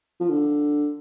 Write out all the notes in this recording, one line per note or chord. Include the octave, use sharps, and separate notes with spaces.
F3
D3